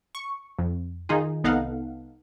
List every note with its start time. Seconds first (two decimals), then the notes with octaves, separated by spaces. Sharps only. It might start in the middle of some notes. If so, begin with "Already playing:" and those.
0.15 C#6
0.59 F2
1.09 D#3 D#4 F4 G#4
1.44 C2 B3 D#4 A4 F5 F#5